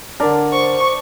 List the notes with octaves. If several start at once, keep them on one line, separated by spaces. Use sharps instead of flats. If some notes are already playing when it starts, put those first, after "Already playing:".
D3 D4 A#4
C5 C#6